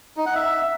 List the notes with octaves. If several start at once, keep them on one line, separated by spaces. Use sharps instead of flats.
D#4
F#5
E5